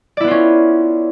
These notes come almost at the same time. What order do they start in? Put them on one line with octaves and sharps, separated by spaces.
D5 E4 B3 F4 C#4